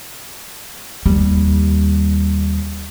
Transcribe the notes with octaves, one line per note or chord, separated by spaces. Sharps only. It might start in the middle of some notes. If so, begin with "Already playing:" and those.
D#2 G3